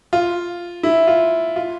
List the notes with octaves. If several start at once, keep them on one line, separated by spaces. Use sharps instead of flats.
F4
E4
F4
F4